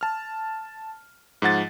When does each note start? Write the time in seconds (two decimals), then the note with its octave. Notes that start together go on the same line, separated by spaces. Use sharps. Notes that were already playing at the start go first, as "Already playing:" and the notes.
0.01 A5 F6
1.42 G#2 F3 F#5 A6